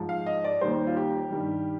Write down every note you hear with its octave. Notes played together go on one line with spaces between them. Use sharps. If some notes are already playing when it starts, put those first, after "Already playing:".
Already playing: G#2 F3
F5
D#5
D5
D#2 D#3 G3 C5
F4
G4
G2 D#3 G3